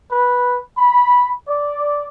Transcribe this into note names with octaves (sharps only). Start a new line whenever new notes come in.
B4
B5
D5